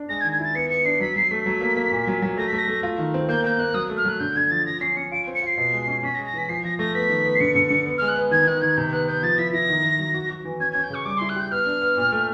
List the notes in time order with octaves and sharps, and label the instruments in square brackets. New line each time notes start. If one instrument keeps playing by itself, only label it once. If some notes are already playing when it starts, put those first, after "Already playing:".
Already playing: [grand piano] D4
[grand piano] G#3 [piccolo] A#6
[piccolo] G#6
[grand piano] D#3
[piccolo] G#6
[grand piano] E4 [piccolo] A6
[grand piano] B3 [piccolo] C#7
[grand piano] B3 [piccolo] C#7
[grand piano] D4 [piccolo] C7
[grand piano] F#3 [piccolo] B6
[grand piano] F#3 [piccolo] C7
[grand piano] A3 [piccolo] B6
[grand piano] F#3
A#3
A#3
A#2
F#3
F#3
[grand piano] A3 [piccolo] A#6
[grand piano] A3 [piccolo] B6
[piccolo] A#6
[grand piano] A3
F4
D#3
C4
[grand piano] A#3 [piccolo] G6
[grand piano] A#3 [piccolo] G6
[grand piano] A#3 [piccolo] F#6
[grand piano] F#3 [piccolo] D#6
[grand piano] A3
[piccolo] F6
[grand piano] F#3 [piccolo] F#6
[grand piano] D3 [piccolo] G6
[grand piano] D3 [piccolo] G#6
[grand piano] F3 [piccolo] A6
[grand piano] F3 [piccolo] A#6
[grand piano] C#4 [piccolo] C7
[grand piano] C#4 [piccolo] C#7
[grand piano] F4 [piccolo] D7
[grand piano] C4
[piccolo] C#7
[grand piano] F4 [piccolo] C7
[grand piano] B2
G#3
C#4
[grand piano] C#4 [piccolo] B6
[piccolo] A#6
[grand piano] G#3
[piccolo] A#6
[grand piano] E3 [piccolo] B6
[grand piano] F3 [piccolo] C7
[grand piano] F3 [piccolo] A#6
[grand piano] A3 [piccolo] A#6
[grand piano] B3 [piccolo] B6
[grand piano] D#3
B3
[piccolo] C7
[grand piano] D3 [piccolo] C#7
[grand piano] D3
D3
B3
[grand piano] G#3 [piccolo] F6
[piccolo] F#6
[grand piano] B3
[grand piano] D#3 [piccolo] G#6
[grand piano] D#3 [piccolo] F#6
[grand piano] D#3 [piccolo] G#6
[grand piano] C3 [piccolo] G6
[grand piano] B3 [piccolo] F#6
[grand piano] B3 [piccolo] G6
[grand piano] F3 [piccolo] A6
[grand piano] E4 [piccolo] B6
[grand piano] E4 [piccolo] A#6
[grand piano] D#3
D#3
F#3
F#4
F#4
E3
[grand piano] C#4 [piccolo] G#6
[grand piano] C#4 [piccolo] G#6
[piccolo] G6
[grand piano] C#3 [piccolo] C#6
[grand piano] G3 [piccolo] D6
[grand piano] E4 [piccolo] C6
[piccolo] F#6
[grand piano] G4 [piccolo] G6
[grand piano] B3 [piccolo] F6
[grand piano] D4
B3
A#2
A3